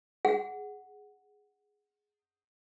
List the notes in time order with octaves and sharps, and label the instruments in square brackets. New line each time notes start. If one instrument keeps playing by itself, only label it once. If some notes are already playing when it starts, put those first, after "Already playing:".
[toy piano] G#4 F#5